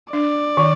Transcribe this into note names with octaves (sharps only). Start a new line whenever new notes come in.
D4 D5
D#3